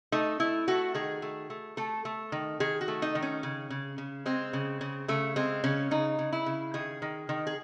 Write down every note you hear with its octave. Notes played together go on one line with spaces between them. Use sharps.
A3 D#4
A3 E4
A3 F#4
D#3 G#4
A3
A3
A3 A4
A3
D#3
D#3 G#4
F#4
A3
D#4
D#3
C#4
C#3
C#3
C#3
G#3 C4
C#3
C#3
C#3 A3
G#3 C4
C#3 C#4
C#3 D#4
C#3
E4
C#3
D#3 G#4
D#3
D#3
G#4